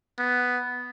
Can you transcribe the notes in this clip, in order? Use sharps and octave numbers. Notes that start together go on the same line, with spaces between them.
B3